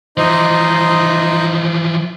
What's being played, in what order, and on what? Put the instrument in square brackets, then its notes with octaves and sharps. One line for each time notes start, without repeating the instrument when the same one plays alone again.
[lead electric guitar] E3 F3 [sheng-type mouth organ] D#4 C5 D#5